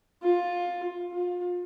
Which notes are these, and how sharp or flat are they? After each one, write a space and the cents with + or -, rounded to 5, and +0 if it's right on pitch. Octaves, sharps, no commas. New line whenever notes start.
F4 +15
F4 +30